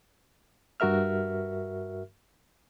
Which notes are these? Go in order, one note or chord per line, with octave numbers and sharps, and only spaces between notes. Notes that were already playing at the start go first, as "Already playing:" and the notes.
G2 F#4 A#4 E5 F6